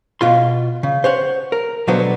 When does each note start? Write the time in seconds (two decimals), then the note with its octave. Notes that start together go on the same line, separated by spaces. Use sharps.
0.21 B2 F4 C6
0.83 C#3
1.04 C5 C#5 F#5
1.52 A#4
1.88 B2 D3 F#3 B3 C5